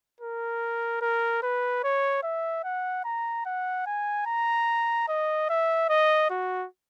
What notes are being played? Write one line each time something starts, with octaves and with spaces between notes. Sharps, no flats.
A#4
A#4
B4
C#5
E5
F#5
A#5
F#5
G#5
A#5
D#5
E5
D#5
F#4